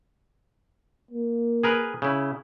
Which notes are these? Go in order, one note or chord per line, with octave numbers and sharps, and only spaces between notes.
A#3
G#4 A#4 B4
C#3 E4